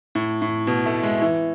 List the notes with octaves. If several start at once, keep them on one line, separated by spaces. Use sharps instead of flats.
A2
A2
B2
A3
G#3
E3